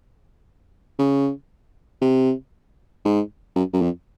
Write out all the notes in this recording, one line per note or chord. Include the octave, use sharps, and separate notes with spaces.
C#3
C3
G#2
F#2
F#2
F2